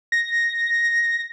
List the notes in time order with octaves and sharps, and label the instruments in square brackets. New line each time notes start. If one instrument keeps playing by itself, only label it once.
[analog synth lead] A#6